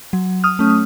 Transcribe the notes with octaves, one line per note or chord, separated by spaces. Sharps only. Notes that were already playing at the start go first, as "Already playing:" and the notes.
F#3
D#6 F6
A3 C#4